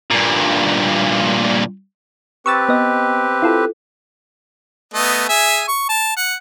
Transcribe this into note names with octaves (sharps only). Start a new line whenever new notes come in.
G2 A#2
C4 G4 B4 C#6 E6 A6
B3 D#5
E4 F4 A4
A3 B3 D#5
G#4 E5 G#5
C#6
A5
F#5